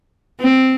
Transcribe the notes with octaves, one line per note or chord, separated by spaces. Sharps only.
C4